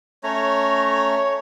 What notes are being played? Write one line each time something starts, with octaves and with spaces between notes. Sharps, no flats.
A3 C#4 C#5 A#5